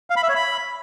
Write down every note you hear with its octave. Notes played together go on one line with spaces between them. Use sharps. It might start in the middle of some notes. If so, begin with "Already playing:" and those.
F5
B5
E5
C#5
B5